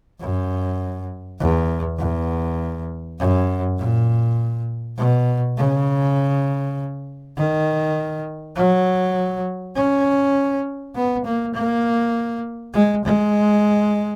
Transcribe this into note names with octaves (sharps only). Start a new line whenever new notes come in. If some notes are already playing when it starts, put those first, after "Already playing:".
F#2
E2
E2
F#2
A#2
B2
C#3
D#3
F#3
C#4
B3
A#3
A#3
G#3
G#3